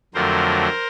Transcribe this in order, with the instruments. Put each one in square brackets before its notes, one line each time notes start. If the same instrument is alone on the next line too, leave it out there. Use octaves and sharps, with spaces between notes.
[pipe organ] F2 D3 F#3 A3 A#4 C5